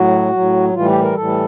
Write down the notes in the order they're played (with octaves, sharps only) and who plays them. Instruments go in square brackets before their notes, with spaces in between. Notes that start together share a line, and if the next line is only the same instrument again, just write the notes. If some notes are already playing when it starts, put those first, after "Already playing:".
Already playing: [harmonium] A2 F#3 F#4
A2 F#3
A2 E3 G3 F4
G4
A#4
A2 E3 G3 A4